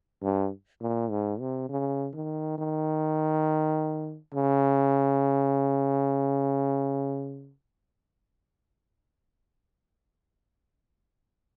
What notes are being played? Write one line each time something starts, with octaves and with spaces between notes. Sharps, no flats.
G2
A#2
G#2
C3
C#3
D#3
D#3
C#3